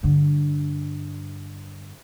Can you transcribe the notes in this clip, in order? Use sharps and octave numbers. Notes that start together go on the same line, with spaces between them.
G2 D3